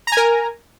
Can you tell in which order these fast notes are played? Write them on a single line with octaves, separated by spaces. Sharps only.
A#5 G#5 A#4